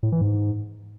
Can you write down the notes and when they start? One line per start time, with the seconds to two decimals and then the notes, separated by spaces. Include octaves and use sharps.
0.03 A2
0.12 E3
0.21 G#2